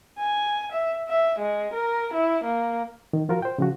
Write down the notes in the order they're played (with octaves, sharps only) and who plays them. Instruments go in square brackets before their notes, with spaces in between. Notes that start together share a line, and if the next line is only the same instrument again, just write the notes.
[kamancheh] G#5
E5
E5
G#3
A#4
E4
A#3
[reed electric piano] D#3
F3 F4 F#4 A#4
C5 G5
C#3 F3 F#4